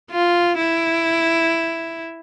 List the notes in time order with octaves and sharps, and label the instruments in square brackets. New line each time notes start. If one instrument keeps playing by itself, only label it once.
[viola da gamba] F4
E4